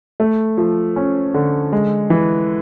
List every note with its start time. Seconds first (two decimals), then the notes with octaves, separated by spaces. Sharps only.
0.20 A3
0.58 F3
0.96 C#4
1.34 D3
1.72 G#3
2.10 E3